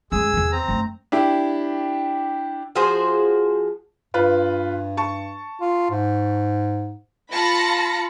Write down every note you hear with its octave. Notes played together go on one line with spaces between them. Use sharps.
F#2 G#3 G#4 E6
E2 D#3
C4 A#5
F#2 A3
D4 E4 G4
F3 F#4 G#4 C5
G2 F4 B4
A5 C#6
F4
G#2
F4 A5 B5 A#6 C#7